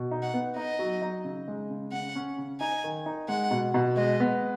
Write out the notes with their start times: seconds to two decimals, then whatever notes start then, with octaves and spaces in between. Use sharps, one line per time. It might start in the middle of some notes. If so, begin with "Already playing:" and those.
Already playing: B2
0.11 D#4
0.22 F#5
0.34 B3
0.56 D#4 D#5
0.79 F#3
1.02 D#4
1.24 C#3
1.48 G#3
1.70 C#3
1.92 C#3 F#5
2.15 C#4
2.38 C#3
2.61 D#4 G#5
2.84 D#3
3.06 D#4
3.28 G#3 F#5
3.51 B2
3.74 B2
3.96 G#3 D#5
4.20 B3